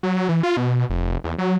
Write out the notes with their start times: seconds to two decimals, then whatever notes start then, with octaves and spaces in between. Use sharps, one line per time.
0.03 F#3
0.29 E3
0.43 F4
0.57 B2
0.90 F1
1.24 E2
1.38 F#3